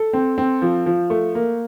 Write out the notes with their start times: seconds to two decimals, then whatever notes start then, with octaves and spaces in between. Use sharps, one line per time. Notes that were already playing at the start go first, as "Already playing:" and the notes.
Already playing: A4
0.13 C4
0.38 C4
0.62 F3
0.86 F3
1.10 A3
1.35 A#3